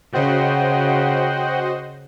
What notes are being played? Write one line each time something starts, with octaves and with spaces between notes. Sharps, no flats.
C#3 F#4 C5 D#5 F#5 G5